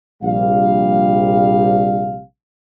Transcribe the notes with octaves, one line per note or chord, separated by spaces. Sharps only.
A#1 C3 G3 F5